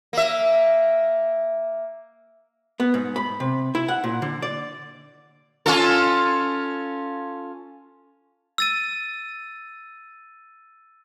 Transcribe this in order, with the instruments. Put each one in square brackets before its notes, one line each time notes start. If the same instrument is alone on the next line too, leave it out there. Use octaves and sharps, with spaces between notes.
[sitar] A#3 E5
[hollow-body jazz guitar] B3
G#2
B5
C3
E4
F#5
A#2
D3
D5
[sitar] C#4 F4 A4
[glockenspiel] E6 A6 D#7